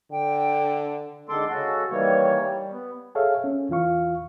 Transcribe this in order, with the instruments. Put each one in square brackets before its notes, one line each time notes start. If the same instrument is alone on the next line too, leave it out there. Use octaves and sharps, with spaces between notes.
[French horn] D3 [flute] G5
[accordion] D3 D#3 G#3 A4 C6 D6
C#3 G#3 F#4 A4
D#3 E3 G3 A#3 C#5
G3
B3
[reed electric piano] G#4 A4 C#5 E5 F5
C#4
E2 E3 F4 F5 C#6